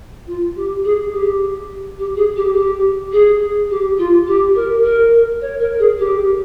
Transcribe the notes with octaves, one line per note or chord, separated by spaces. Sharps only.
F4
G4
G#4
G4
G4
G#4
G4
G4
G#4
G4
F4
G4
A#4
A#4
C#5
A#4
G#4
G4